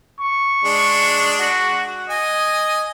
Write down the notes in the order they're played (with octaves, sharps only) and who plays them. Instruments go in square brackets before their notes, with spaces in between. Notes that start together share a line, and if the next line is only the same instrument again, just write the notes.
[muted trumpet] C#6
[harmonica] G#3 D4
[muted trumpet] F#4
[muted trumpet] D#5 [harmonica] G#5